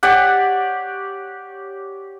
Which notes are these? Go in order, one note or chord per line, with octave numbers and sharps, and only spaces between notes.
G4 C#5 D5 F#5